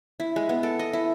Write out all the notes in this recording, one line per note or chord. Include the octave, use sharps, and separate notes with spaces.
E4
G#3
B3
A4
D#5
E4